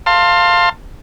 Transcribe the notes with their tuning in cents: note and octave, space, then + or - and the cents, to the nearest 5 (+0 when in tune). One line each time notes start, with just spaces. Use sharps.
F5 +0 A5 +35 C6 +15